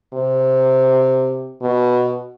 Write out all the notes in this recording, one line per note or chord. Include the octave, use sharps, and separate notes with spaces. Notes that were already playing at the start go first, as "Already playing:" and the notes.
C3
B2